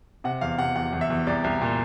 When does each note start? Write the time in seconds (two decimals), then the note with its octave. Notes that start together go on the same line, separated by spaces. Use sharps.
0.24 C3 F#5
0.41 E2 F5
0.58 C3 F#5
0.76 E2 F#5
0.93 E2
1.01 E5
1.10 E2
1.27 C2 D5
1.44 C2
1.61 A#2